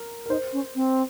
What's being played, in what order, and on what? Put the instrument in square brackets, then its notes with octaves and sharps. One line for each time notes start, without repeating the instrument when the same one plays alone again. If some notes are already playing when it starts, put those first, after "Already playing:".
Already playing: [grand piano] A#4
A#4
[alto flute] D#4 [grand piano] C5
[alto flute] C#4
C4